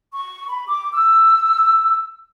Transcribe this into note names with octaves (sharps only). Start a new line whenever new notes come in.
C#6
B5
D6
E6